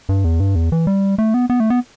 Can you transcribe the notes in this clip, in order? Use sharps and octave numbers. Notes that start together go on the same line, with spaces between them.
G2
E2
G2
E2
E3
G3
A3
B3
B3
A3
B3